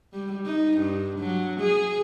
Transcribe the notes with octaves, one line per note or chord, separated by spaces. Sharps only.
G3
D#4
G2
F#3
G#4